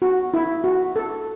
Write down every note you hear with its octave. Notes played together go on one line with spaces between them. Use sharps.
F#4
E4
F#4
A4